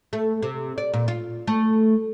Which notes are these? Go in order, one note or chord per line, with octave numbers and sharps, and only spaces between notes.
A3
C3
D5
A#2
F4
A3